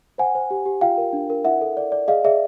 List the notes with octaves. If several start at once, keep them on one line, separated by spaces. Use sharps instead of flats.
C5 F#5 G#5
C5
G4
G4
F4 F5 G5
A#4
D4
A#4
E4 E5 F#5
A4
D5
D5
G#4 D#5 F5
G#4 D5 E5